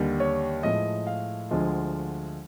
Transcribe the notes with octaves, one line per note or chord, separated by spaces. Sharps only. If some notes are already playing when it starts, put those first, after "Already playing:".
Already playing: D#2 D3 G3
C#5
A2 F3 G#3 D#5
F5
D2 D3 F3 G#3